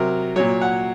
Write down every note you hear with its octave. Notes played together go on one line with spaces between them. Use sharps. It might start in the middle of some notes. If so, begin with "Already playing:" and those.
Already playing: C3 F#3 A#4
A#2 F#3 C#5
F#5